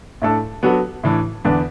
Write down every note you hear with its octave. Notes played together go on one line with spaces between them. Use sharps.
A2 A3 D4 A4
F#3 B3 D4 F#4 A4
A2 E3 D4
E2 D3 B3 D4